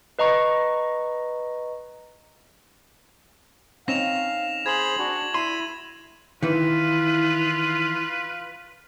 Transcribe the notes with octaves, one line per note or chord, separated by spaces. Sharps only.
B4 D#5 A#5 C#6
C4 C#4 D#4 F5 A#6 E7 F7
G#4 C5 B5 G#6 F#7
D4 F#4
E4 B5 C6 D#7
D#3 E3 E4 F4 B4